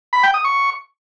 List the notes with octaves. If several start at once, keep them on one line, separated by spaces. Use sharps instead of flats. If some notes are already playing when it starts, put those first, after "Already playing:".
B5
G5
D#6
C#6